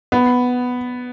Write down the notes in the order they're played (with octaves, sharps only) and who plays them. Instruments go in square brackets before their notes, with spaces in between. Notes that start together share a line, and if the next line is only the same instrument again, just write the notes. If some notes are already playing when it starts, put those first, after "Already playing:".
[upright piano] B3